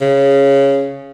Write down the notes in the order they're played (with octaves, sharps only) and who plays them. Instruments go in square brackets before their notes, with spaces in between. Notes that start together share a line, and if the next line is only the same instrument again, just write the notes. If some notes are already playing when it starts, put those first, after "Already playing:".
[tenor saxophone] C#3